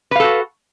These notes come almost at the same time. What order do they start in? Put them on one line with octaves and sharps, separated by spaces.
B4 F5 A4 F#4